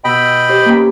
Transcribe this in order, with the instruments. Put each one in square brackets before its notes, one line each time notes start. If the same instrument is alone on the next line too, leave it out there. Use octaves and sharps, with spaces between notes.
[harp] B2 E6 [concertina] D#5 G5 B5
[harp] G4 C5
A#3 C#4